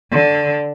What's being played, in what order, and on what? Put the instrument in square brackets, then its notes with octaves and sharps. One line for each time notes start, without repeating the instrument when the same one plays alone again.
[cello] D3